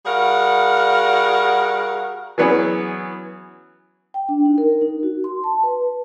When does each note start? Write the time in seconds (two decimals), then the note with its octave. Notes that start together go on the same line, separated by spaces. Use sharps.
0.06 G3 F#4 G#4 A#4 F5 F#5
2.38 E3 F#3 B3 C#4 G#4
4.14 G5
4.29 D4
4.45 D#4
4.58 A#4
4.81 D#4
5.03 F#4
5.24 C6
5.44 A5
5.64 B4